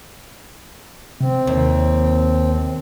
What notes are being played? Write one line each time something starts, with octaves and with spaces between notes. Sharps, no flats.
C3 C4
D#2